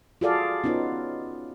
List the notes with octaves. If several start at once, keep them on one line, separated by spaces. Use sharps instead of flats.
F4 F#4 G#4 A4 D5 F5
B3 C#4 D#4 F4